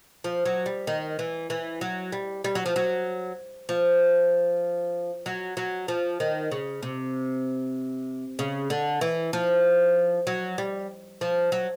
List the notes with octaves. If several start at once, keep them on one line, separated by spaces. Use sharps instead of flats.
F3
F#3
G3
D#3
E3
E3
F#3
G3
G3
F#3
F3
F#3
F3
F#3
F#3
F3
D#3
C#3
C3
C#3
D3
E3
F3
F#3
G3
F3
F#3